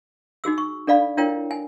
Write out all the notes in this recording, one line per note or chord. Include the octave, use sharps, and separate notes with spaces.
D#4 F#4 G#4 E6
C#6
D4 A4 D5 F5 B5
D4 E4 F4 A#4 C#5 G5
G#5